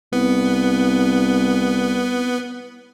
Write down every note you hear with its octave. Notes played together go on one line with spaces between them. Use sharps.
C2 B3